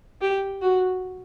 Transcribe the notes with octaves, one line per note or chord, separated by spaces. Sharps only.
G4
F#4